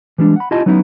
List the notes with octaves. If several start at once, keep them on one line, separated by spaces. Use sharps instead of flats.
E3 G3 G#3 D4
F#5 B5
E4 F4 G4 D#5 G#5 A5
F#3 B3 C#4 D#4 E4